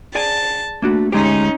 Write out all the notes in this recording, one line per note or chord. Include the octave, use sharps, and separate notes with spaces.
G#4 D5 G#5 A5
A3 A#3 D4 F#4
D2 G#3 C#4 D#4 G4